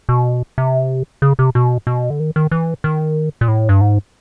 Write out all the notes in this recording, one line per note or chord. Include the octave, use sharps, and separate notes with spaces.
B2
C3
C#3
C3
B2
B2
D3
D#3
D#3
E3
D#3
A#2
A2
G2
G#2